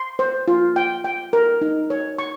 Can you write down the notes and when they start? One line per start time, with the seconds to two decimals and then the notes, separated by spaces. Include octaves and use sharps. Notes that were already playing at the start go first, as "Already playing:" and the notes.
Already playing: C6
0.19 C5
0.48 F4
0.76 G5
1.04 G5
1.33 A#4
1.61 D#4
1.90 C#5
2.18 C#6